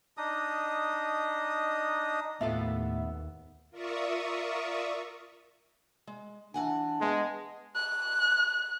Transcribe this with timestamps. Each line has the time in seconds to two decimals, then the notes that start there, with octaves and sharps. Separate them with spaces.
0.17 D4 D#4 D#5 D#6
2.41 D#2 A2 B3 F4 A4 E5
3.71 F4 A#4 D5 E5 C#6 D#6
6.07 G#3
6.54 E3 D4 F#5 G#5
7.01 G#3 B3
7.76 F#6